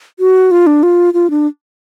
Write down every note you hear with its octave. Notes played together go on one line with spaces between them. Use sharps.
F#4
F4
D4
F4
F4
D4